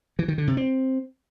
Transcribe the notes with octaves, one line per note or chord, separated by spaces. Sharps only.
E3
D#3
D3
C3
C4